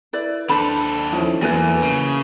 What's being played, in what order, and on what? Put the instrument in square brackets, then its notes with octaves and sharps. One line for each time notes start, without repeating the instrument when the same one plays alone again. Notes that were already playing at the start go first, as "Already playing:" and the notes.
[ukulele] E4 B4 D5
[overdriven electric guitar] D#2 A4 [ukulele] D4 C5 B5
[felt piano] F3 C#4 E4 [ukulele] D#4
[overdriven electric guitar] E2 [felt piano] F#3 A3 A#3 [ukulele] E4 B4 G#5
[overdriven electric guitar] C#3